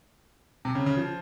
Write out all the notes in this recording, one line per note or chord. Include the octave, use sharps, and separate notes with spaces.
C3
C#3
C#3
F3